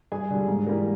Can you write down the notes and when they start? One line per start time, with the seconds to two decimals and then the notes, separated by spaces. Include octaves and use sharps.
0.12 G2 G#4 G#5
0.30 D3 G3
0.48 G#2
0.67 E3 G3 A#3